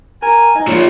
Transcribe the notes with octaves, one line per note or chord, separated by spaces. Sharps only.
A#4 G#5
D#4
A#2 D#3 F3 C#5